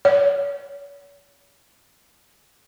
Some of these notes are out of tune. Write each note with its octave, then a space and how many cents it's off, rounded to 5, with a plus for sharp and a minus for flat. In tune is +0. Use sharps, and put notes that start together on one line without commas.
C#5 +35